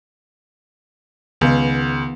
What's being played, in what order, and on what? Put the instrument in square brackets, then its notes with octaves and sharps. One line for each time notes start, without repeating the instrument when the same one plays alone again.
[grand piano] C#2 [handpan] D#3 B3 F5